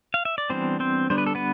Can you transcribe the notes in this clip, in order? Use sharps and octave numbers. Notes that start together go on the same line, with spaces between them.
F5
E5
D5
E3 G3 B3 C4 D4 C5
C4 C5
D3 G3 B3 D4 C5
B4
A4
B3 B4